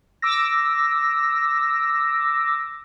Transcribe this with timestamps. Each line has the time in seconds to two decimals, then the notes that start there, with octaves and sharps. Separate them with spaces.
0.22 D6 E6 A#6